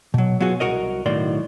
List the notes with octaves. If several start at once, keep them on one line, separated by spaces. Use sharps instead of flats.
B2 F#3
F#3 B3 F4 F#4 G#4
C2 G2 F#4 A#4 D#5
B1 A2 D#3 F#4 D5 C6